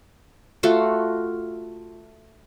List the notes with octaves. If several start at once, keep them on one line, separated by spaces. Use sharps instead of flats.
A3 F4 F#4